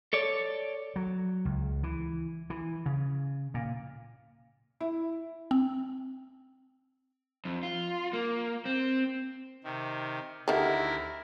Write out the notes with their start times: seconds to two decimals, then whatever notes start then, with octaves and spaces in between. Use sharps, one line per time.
0.13 A4 C#5 D5
0.96 F#3
1.45 C#2
1.83 E3
2.50 E3
2.86 C#3
3.54 A#2
4.81 E4
5.51 C4
7.45 F2
7.63 F4
8.13 A#3
8.65 C4
9.64 C3 D#3
10.48 D2 D#3 A3 E4 G4 A#4 E5 F#5